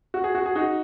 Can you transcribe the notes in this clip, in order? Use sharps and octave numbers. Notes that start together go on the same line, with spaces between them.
F#4
G#4
F#4
G#4
D#4 F#4